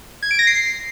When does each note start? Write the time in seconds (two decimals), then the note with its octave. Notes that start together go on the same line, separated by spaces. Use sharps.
0.23 G#6
0.31 D7
0.39 A#6
0.47 C7